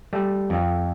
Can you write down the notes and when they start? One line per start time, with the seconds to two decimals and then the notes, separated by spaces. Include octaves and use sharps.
0.13 G3 A3
0.50 F2